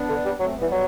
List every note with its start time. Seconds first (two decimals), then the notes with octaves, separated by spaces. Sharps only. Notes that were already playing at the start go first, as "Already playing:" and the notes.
Already playing: B3 D4
0.09 D3
0.25 G3
0.40 F#3 A3 C4
0.55 G3 B3
0.62 E3
0.72 F#3